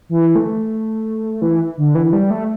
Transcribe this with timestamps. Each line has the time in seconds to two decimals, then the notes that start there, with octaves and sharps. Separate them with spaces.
0.09 E3
0.35 A3
1.42 E3
1.77 D3
1.95 E3
2.13 G3
2.30 A3